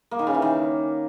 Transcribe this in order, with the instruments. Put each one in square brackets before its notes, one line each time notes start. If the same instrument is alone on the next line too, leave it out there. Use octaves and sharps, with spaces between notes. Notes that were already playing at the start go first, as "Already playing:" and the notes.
[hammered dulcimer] A#3
D#3
C#3
E3
D#3